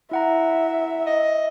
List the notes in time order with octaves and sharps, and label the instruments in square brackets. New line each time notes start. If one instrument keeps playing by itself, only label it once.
[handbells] E4 F#5 A#5 [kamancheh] E5
[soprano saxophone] D#5